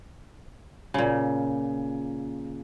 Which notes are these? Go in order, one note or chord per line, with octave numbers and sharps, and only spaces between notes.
A#2 C#3